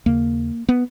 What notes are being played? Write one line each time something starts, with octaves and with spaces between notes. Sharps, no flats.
D#2 C#3 A#3
B3